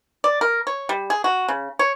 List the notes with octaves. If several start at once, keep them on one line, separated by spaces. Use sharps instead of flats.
D5
A#4
C#5
G3
G#4
F#4
C#3
C#5